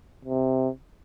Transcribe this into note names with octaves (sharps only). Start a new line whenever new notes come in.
C3